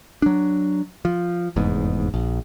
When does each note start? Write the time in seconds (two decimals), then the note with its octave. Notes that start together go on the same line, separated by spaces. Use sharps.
0.22 F#3 D4
1.05 F3
1.56 F1 E2 G#2
2.14 A#1